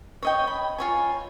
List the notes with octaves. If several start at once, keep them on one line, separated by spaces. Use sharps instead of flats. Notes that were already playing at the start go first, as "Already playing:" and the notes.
C#5 D#5 G5
B5
F4 C#5 G#5